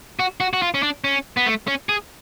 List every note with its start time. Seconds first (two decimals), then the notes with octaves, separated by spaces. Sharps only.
0.19 F#4
0.40 F#4
0.53 F#4
0.62 F4
0.74 C#4
0.83 D4
1.04 C#4
1.37 B3
1.47 A3
1.67 C#4
1.89 G#4